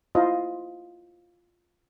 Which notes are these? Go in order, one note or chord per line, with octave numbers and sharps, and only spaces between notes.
E4 F4 C5 D#5